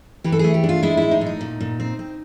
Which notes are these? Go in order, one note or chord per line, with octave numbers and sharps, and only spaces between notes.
E3 G4
A4
A3 G#4
G4
D4
F4
G#3 E4
A2 E4
D#4
A2
D#4
A#2
A#2
C4
C4